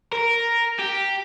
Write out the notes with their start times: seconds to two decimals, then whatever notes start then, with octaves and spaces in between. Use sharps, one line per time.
0.12 A#4
0.79 G4